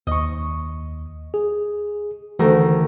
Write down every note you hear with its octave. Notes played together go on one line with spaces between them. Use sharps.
D#2 D#5 C#6
G#4
D2 D#3 E3 A4 A#4